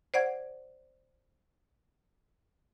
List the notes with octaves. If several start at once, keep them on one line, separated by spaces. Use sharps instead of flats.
C5 D5 F#5 G#6